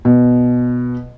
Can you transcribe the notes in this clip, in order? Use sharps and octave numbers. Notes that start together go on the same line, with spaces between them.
B2